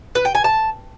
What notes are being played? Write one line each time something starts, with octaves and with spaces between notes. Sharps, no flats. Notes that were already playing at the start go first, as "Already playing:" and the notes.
B4
G5
G#5
A5